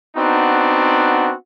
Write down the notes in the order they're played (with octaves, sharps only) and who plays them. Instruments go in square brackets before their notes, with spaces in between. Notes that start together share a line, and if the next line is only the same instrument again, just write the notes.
[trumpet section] B3 C4 D4 D#4 F#4